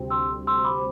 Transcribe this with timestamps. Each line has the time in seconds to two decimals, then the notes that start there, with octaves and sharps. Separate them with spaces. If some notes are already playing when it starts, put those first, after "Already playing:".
Already playing: D2 C3 G3 C4
0.10 C6 E6
0.47 C6 E6
0.65 B5 D6